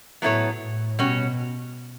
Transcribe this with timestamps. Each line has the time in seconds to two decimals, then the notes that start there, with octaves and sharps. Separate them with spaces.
0.22 A2 F#3 B3 E4 A4 C#5
0.61 A2
0.99 B2 G3 C#4 F#4 C#5